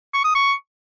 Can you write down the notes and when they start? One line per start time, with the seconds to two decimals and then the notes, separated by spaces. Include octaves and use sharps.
0.14 C#6
0.24 D#6
0.35 C#6